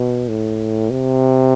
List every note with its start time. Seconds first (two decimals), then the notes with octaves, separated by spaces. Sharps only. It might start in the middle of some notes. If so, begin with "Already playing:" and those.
Already playing: B2
0.28 A2
0.90 C3